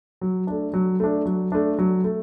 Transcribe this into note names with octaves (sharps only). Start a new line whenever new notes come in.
F#3
A3 D4
F#3
A3 D4
F#3
A3 D4
F#3
A3